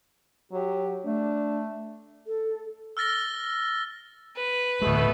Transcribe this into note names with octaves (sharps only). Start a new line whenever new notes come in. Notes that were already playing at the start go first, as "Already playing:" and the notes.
F#3 G4
A3 D4
A4
E6 F6 A6 A#6 G7
B4
D1 B2 G#3 A3 B3